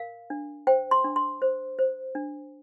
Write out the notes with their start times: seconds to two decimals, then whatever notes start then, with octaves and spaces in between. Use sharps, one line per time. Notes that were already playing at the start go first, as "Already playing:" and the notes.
Already playing: A#4 F5
0.30 D4
0.67 C5 G5
0.91 C6
1.04 D4
1.16 C6
1.42 C5
1.79 C5
2.15 D4